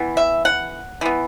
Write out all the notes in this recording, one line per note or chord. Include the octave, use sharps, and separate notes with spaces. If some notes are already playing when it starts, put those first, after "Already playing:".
Already playing: E3 B3
E5
F#5
E3 B3